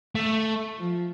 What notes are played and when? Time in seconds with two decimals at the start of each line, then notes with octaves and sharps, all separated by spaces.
0.15 A3
0.78 F3